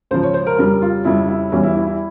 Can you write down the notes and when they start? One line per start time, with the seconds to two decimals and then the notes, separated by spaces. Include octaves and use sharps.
0.11 C#2 C#3 F3 C5
0.23 C#5
0.34 C5
0.47 A#4
0.58 F2 C#3 G3 A#4
0.82 F4
1.05 F2 C#3 G3 E4
1.28 E4
1.52 E2 E3 G3 C#4
1.63 E4
1.76 E4
1.87 E4